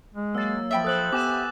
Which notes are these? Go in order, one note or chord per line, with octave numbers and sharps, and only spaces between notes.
G#3
F#3 A#3 E6 A6
F3 E5 G5 B5
A4 C5 D#6 F#6 F#7
B3 G4 G#5 D6 E7